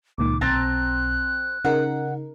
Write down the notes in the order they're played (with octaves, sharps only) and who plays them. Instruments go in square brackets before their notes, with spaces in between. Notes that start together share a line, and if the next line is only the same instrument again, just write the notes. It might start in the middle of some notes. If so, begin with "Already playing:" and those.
[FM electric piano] C#2 A#2 D#3 [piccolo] D6
[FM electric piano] B1 [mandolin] C4 A5 A#5 [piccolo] F#6
[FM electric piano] C#3 D#4 A#4 [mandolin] F#5